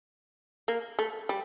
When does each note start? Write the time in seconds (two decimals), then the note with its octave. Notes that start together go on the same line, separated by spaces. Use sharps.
0.68 A#3
0.99 A3
1.29 G3